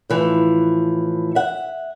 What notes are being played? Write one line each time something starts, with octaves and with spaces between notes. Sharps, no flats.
A2 E3 F3
E5 F#5